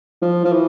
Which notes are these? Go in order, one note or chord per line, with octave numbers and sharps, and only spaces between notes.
F3
F3
E3